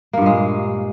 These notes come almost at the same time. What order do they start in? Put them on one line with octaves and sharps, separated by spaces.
A#3 G2 A#2 G#3